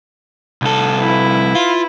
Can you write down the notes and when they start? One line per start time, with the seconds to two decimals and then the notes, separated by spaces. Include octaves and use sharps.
0.62 C2 A4
0.98 E4 B4
1.55 F4